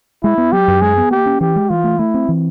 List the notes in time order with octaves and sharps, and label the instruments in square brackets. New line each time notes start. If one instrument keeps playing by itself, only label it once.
[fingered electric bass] G#3 [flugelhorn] E4
[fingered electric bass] B3
[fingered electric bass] F#3 [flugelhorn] G4
[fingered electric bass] F#2
[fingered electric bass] G#3 [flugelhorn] G#4
[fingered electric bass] B3
[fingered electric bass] A#3 [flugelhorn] G4
[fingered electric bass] C#4
[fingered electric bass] E3 [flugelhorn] G4
[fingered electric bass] G#3
[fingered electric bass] E3 [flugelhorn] F4
[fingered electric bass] A3
[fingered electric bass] A3 [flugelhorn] E4
[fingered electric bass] C4
E3